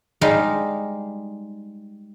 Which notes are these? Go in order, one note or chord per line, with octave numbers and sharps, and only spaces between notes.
G3 G#3 D#4 F5